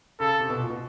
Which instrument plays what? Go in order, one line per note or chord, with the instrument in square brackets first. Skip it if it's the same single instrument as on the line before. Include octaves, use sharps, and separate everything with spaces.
[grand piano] C#3 [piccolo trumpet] A4
[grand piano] C3
B2
A#2
B2